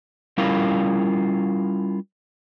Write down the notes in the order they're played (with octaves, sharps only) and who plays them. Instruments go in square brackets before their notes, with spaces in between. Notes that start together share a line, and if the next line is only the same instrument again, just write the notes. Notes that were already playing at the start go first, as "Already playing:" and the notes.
[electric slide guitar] G3 C#4 E4 F4 A#4 F5